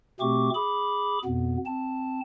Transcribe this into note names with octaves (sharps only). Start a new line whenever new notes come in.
B2 A3 C4 G4 C#6 D6
G#4 B5 D6
F2 B2 B3
C4 A5